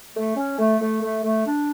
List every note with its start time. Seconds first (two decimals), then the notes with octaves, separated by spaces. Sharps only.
0.15 A3
0.36 C#4
0.58 A3
0.80 A3
1.02 A3
1.23 A3
1.45 D4